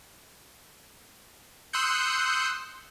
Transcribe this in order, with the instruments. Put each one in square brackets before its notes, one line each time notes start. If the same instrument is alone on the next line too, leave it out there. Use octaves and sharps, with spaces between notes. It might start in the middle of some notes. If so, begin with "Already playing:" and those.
[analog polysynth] C6 D#6 E6 F#6 G6 C#7